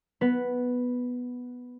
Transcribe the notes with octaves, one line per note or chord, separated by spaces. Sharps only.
B3 B4